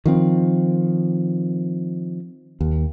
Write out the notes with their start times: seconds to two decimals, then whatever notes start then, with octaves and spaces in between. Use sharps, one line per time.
0.06 D#3 F3 C4
2.61 D#2